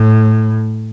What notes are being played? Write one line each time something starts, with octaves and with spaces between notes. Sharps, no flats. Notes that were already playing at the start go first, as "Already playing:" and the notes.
Already playing: A2